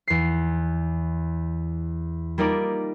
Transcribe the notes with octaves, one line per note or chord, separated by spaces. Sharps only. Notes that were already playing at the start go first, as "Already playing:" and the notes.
E2 C7
G3 A#3 D#4 F4 A#4 D5